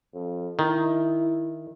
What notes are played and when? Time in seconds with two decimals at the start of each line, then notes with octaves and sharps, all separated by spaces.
0.14 F2
0.59 D#3 E4